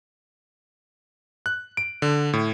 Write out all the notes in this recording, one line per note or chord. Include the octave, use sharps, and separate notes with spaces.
F#6
D7
D3
A2